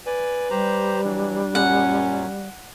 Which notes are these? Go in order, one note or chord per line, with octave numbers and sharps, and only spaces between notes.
B4 D5 G#5
G3 G4 C5 A#5
E3 F#3 D4
F#2 A#2 F#3 C#4 F#5